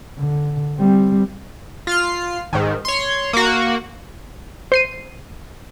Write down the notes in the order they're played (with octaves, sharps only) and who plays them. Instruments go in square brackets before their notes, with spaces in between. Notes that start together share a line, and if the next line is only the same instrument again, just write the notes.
[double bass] D3
G3 C4
[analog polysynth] F4 F6 C7
G#2 D#3
C#5 C6
A#3 F#4
[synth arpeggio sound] C5 C7 D#7